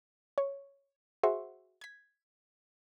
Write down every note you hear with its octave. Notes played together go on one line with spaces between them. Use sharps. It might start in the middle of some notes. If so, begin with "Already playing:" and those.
C#5
F#4 G#4 C5 E5 C6 C#6
G#6 B6